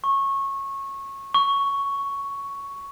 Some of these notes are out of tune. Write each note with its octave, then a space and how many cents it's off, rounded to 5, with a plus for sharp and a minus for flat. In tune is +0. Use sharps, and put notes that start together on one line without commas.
C#6 -20
C#6 +5